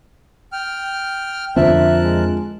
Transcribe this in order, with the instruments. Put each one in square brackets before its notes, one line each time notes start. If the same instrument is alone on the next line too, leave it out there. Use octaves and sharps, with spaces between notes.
[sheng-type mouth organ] G5 F6
[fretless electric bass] F2 D3 C4 [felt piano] F3 [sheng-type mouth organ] A#4 A5 F#6 [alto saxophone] E5
[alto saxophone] G#3